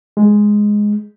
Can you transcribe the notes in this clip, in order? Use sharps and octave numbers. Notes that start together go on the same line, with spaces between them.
G#3